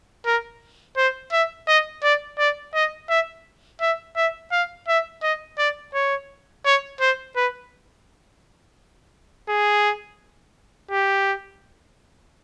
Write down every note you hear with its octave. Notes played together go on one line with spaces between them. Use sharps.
A#4
C5
E5
D#5
D5
D5
D#5
E5
E5
E5
F5
E5
D#5
D5
C#5
C#5
C5
B4
G#4
G4